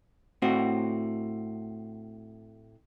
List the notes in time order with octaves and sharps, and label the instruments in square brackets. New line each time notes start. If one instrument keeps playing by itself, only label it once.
[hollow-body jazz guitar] A2 C4 F#4